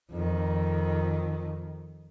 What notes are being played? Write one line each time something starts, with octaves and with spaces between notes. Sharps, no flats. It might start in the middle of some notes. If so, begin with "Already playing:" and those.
F2 D#3